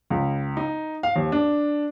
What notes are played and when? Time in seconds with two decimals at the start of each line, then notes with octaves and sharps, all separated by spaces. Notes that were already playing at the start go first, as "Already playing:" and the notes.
0.10 C#2
0.57 D#4
1.03 F5
1.16 D#2
1.32 D4